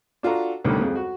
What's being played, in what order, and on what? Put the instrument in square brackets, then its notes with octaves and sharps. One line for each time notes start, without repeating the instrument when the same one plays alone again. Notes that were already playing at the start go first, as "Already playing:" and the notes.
[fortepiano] D4 F4 F#4 A4 A#5
A1 D2 D3 D#3 G3 B3
F2 G#3
F#4